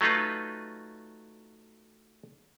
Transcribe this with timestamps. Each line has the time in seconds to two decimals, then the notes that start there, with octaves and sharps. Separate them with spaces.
0.01 F#3 A3 D#4 F4 B4